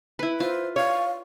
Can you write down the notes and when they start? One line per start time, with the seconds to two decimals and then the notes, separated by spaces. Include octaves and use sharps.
0.19 E4 B4
0.40 F4 C5
0.76 C#5 F5